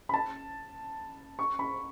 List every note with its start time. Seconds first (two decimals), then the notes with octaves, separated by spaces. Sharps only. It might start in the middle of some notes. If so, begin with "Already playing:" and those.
0.09 B5
0.14 A5
1.39 C#6
1.59 B5